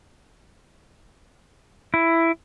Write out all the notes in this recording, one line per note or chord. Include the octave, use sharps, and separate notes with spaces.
E4